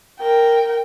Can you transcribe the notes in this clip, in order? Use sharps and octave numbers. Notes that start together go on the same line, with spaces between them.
A#4 G5